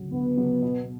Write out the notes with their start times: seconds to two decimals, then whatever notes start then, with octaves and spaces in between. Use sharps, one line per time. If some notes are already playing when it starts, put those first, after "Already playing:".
Already playing: D2 C#3 F#3
0.12 D2 B3
0.37 C#3 F#3
0.62 B2